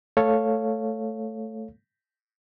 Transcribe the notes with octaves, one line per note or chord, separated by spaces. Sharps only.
A3 A4 C#5 F5